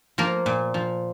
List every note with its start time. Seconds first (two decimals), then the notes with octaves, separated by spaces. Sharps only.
0.18 F3 A#3 A#4
0.46 A#2
0.74 F3